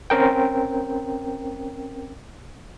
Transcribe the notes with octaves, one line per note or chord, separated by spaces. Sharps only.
C4 C#4 A#4 G5